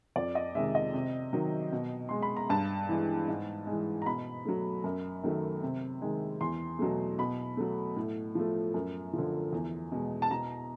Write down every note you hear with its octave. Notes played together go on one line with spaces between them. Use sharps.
F2 D5
D#5
C3 D#3 G#3 E5
D#5
C3
D#3 F#3
B2
G#3 C6
B5
A#5
G2 A5
E3 G#3
G#2
E3 G#3
A#5
B2 B5
F#3 A3
F#2
D#3 F#3 A3
C3
D#3 G#3
E2 C6
B2 F#3 A3
B2 B5
F#3 A3
A2
F3 A3
F#2
D3 F3
E2
B2 G#3
A5
B2 A#5